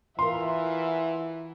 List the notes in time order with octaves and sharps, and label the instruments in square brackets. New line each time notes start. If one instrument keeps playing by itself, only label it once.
[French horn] E3 [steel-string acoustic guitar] F4 A#4 [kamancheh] E5 F#5 [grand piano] C6